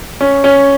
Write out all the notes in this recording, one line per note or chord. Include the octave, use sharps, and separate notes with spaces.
C#4
C#4